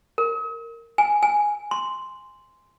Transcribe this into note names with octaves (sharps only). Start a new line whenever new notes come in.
A#4
G#5
G#5
C6